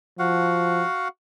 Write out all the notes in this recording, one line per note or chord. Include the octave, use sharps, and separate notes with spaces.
F3 F#4 F5 F#5